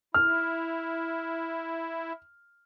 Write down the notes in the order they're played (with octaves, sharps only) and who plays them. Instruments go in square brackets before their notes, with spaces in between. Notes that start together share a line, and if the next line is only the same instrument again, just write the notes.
[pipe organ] E4 [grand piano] F6